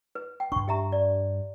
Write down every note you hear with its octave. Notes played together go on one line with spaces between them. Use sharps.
B4
G5
G2 D4 C#6
G4 E5 A#5
D5